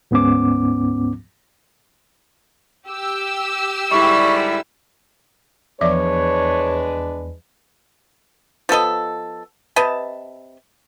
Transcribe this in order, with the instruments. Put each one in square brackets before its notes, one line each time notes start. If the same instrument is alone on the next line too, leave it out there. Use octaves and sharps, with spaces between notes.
[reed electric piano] D2 G#2 B3 C#4 D6
[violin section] G4 E6
[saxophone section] G#2 D3 G3 [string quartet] E4 [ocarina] C#6
[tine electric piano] E2 [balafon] F3 D5 E5 [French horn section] G#3 D4 B4 [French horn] C#5
[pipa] F3 B3 A4 D#5
C3 B4 D#5 A5